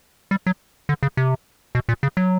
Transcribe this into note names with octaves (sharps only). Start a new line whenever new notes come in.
G3
F#3
D3
C#3
C3
B2
A#2
C#3
F#3